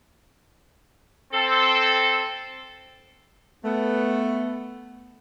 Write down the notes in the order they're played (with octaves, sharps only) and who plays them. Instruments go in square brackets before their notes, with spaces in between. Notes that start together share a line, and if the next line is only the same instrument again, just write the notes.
[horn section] C4 A4
A3 B3